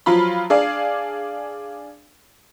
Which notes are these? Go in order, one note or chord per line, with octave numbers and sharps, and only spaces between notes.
F3 F#3 F4 B5
D4 G#4 D5 F5